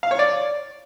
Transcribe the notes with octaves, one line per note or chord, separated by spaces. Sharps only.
F5
C#5
D5